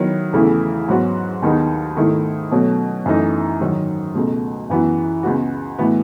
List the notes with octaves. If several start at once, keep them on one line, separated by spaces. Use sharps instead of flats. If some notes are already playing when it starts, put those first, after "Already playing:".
Already playing: D#3 F#3 B3 E4
E2 C#3 E3 A3 E4
G#2 F#3 B3 F#4
D#2 D#3 G#3 B3 D#4
G#2 D#3 A3 E4
B2 F#3 A3 C#4
F#2 E3 A3 D#4
G#2 D#3 F#3
C#2 B2 A3
F#2 E3 B3 F#4
C#2 C#3 G#3 B3 F#4
A2 E3 B3 F#4